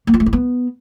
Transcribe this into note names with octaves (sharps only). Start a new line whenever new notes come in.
A#3
F4
A3
E4
B3